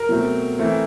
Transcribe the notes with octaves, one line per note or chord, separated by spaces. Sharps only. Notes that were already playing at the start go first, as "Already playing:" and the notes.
Already playing: A#4
B2 F#3 A3 C4
E3 A3 C4